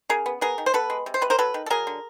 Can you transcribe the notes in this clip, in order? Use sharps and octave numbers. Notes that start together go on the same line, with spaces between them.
C#3 G#4 A#4
B3
B3 G#4 A#4
D#3
C5
B3 A4 B4
G#3
C3
C5
C3 B4
A#4 C5
F#3 A4 B4
D#3
A4
F#3 G#4 A#4
D3